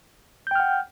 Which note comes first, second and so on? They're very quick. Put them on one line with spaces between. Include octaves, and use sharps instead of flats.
G6 G5 F6 F#5